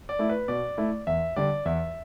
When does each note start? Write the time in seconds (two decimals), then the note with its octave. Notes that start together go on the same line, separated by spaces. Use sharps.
0.09 D5
0.19 A3 E4
0.29 B4
0.48 B2 D5
0.78 A3 E4
1.07 E2 E5
1.36 D3 G3 D5
1.65 E2 E5